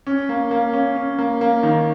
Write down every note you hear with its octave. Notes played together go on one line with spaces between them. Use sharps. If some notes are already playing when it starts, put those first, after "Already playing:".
C#4
A#3
A#3
C#4
C#4
A#3
A#3
D#3